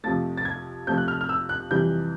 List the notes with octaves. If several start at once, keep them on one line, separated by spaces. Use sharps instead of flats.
F2 C3 F3 A3 A6
A6
G#6
F2 C3 F3 A3 G6
F#6
F6
F6
E6
F#6
F2 C3 E3 G3 G6